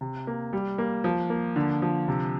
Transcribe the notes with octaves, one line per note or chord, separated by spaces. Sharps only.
C3
A#3
G3
A#3
F3
A#3
D3
F3
C3